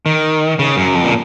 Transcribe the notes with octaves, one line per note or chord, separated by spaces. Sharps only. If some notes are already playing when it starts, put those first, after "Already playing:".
D#3
C#3
F#2
F2
A#2